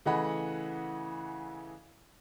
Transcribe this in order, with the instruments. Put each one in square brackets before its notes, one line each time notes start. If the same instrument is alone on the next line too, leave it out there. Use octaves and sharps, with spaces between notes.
[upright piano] C#3 E3 A3 D#5 F#5 B5